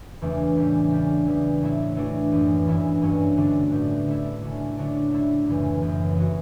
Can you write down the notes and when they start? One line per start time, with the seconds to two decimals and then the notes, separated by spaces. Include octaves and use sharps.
0.22 E2 C#3 E3 A3 D4
0.57 A2 E3 G3 C#4
0.92 C#3 G3 D4
1.27 E3 G3 B3
1.62 A2 F#3 A3 E4
1.96 E3 A3 D4 F#4
2.32 F#2 E3 B3 D4
2.67 G2 E3 A3 C#4 E4
3.02 G2 F#3 C#4 F#4
3.37 D3 A3 D4 F#4
3.72 A2 G3 B3
4.07 D3 A3 E4
4.42 D3 A3 C#4
4.77 D3 F#3 A3 D4
5.12 D3 A3 E4
5.47 F#2 C#3 E3
5.82 F#2 E3 B3
6.17 E3 B3 F#4